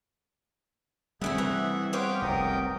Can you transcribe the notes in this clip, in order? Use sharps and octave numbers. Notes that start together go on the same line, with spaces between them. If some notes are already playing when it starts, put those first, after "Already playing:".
D3 G3 A3 C4 C#4 G#4 E5 F#5
E3
B3 G4 C5 C#5 F5 D6
F1 C2 G#2 A#4 G5 D#6